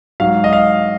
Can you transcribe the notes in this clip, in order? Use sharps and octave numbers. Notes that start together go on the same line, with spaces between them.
G#2 F#3 F5
D#5
F5